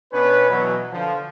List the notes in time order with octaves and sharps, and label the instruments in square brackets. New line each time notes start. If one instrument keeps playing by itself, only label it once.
[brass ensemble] B2 B3 C#4 D4 B4
B2 E3 F#3
D3 F3